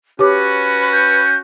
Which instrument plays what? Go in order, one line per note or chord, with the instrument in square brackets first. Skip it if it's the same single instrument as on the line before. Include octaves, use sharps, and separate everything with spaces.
[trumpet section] C#4 F#4 [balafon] G4 C#5 D6 [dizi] B4
[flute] G6